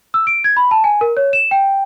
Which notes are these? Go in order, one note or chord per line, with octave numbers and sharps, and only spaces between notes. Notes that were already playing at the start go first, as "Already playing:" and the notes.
E6
D7
G#6
B5
A5
G#5
A#4
C#5
E7
G5